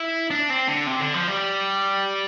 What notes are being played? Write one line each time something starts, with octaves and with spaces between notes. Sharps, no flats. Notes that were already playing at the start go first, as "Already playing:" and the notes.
Already playing: E4
D4
C4
D3
C3
D3
F3
G3